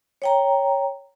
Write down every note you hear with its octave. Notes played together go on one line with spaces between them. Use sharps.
C#5 G5 A#5